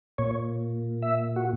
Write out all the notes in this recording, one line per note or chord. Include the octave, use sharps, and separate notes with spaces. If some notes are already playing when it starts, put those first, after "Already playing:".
A#2 C#5
E5
F#4